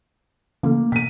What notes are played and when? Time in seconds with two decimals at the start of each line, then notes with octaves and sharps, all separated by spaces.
0.63 C#3 E3 A3 A#3
0.92 B2 B6 D#7